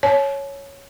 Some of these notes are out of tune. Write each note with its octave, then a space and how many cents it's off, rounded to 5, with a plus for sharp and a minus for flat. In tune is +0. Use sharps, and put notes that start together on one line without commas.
C#5 +0 A5 -45